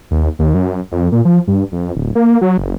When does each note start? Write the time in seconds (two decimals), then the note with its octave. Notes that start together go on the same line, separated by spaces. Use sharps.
0.11 D#2
0.39 D#2
0.54 F#2
0.92 F2
1.12 A#2
1.25 F3
1.47 G2
1.72 F2
1.96 D1
2.15 A#3
2.41 F#3
2.58 F#1